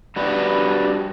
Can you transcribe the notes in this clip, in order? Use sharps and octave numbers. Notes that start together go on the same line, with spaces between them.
G3 D4 F#4 B4